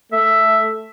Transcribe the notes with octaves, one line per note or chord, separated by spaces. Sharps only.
A3 E5